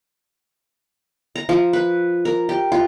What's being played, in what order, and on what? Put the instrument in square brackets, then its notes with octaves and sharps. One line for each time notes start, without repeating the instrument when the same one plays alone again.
[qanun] A#5
F3
B4
A#4
G4
F4